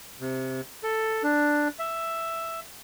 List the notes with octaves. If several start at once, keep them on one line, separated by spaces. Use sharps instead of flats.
C3
A4
D4
E5